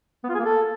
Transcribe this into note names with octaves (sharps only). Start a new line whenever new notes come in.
B3
F4
G#4
A#3
A4